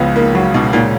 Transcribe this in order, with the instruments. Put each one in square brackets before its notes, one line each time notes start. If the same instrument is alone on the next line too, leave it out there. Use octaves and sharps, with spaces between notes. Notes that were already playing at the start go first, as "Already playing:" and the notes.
Already playing: [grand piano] C#2 C#3 F3 G#3 [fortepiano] B3
[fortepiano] A#3
F#3
B2
A#2